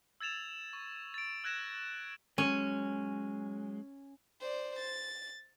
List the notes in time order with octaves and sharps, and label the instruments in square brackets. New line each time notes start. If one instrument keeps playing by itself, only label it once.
[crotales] E6 G#6 A6 E7 F7
C#6
A6 D7
E6 F#6 G#6 A#6 E7
[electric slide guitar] F#3 G#3 [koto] C#4
[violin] C5 D5
A6